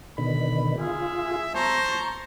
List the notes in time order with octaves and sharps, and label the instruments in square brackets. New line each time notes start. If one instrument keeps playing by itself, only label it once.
[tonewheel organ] B2 D3 D#3 [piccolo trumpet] B5
[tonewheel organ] F4 [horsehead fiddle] G#4 [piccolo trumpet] E5
[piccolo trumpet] C5 [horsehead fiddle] A5 A#5 [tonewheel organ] C#6